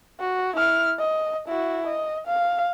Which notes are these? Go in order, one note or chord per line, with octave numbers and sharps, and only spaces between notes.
F#4
E4 F6
D#5
E4 F#4
D#5
F5